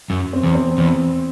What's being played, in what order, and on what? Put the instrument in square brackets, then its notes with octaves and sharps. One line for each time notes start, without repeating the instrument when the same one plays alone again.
[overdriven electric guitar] F#2
[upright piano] C4
[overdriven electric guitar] E2
[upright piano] C4
[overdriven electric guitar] E2